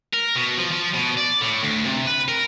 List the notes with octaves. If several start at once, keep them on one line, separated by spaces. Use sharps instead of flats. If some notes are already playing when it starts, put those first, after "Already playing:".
A#4
B2
F3
F3
B2
D5
A2
D2
C3
B4
A#4